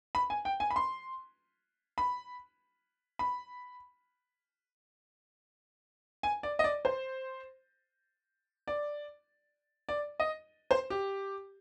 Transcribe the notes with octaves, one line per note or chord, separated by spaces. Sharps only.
B5
G#5
G5
G#5
B5
C6
B5
B5
G#5
D5
D#5
D5
C5
D5
D5
D#5
C5
G4